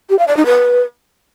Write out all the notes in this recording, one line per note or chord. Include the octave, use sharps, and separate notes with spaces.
G4
F5
D5
D#4
B4